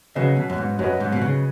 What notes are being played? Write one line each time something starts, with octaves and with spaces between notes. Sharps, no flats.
C#3 F#3 C#4 F#4 B4 D#5
B2
F#2
G#2
F#2 F#3 C#4 F#4 B4 D#5
G#2
B2
C#3